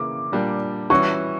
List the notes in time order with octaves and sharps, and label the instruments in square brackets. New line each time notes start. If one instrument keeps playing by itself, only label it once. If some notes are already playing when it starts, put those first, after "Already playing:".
Already playing: [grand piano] C#3 E3 A#3 [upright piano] D6
[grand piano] A#2 G3 A#3 D4
[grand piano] E3 G3 C#4 F#4 [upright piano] C#6